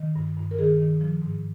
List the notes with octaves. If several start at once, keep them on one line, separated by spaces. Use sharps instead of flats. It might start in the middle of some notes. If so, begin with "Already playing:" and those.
Already playing: D#3
G2
G2
A#4
D#3 G#4
D#3
F3
G#2